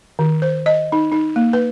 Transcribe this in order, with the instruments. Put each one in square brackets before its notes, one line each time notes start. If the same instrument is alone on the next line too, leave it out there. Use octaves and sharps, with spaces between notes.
[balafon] D#3
C5
D#5
D#4
D#4
A#3
B4